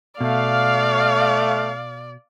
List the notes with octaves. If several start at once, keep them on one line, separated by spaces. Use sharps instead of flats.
B2 A3 D5 F5